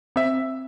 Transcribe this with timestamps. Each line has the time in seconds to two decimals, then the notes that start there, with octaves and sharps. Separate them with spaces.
0.16 C4 E5